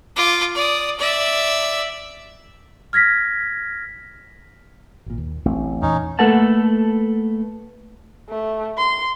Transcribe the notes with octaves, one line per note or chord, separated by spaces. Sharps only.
F4 D6
D5 D#6
D5 E5
F6 G#6 A#6 B6
G#1 A#2
D#2
A1 A3 C4
E2 A#2 E3 C#4 D#4
A3 A#3 A4 B4 F#5 A5
A3
C6